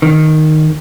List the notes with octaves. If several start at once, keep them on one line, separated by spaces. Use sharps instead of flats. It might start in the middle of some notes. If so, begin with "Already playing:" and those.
D#3